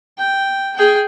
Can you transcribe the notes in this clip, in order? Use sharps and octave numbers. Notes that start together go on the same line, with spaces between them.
G5
G#4 G5